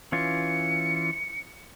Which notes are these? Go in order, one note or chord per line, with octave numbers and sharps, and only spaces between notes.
E3 C#4 F4 C#7